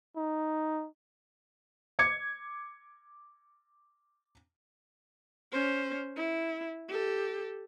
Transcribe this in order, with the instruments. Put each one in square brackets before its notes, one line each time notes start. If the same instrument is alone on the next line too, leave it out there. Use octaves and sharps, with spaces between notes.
[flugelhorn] D#4
[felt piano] D6 G#6 C#7
[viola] C#4 C5
E4
G4 A4